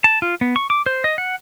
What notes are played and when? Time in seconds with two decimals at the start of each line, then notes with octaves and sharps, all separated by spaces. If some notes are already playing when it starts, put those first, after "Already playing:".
0.04 A5
0.22 F4
0.41 B3
0.56 C#6
0.70 D6
0.86 C5
1.04 D#5
1.18 F#5